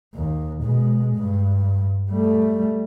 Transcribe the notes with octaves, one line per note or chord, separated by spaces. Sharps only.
D#2
B2 G#3
G2
G3 A3